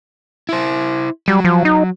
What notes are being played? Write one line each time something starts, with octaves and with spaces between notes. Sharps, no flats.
E4 C5
F#3 G3
F3
D#4